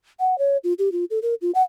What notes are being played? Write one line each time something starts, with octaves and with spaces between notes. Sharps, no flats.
F#5
C#5
F4
G4
F4
A4
A#4
F4
F#5